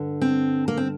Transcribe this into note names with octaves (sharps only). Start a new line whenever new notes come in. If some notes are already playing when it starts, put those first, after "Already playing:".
Already playing: G2 D3
C4
A#3
C4